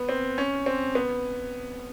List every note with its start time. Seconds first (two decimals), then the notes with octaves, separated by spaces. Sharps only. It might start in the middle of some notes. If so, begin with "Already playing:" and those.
Already playing: B3
0.09 C4
0.38 C#4
0.66 C4
0.95 B3